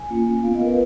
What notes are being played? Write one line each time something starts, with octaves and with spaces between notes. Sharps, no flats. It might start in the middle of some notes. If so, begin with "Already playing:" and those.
Already playing: G#5
A#3 C#4 F4
B3 F4 F5
D#5
A#4
B4